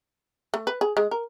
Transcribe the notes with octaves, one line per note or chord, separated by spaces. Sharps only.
A3
B4
G#4
G#3
A#4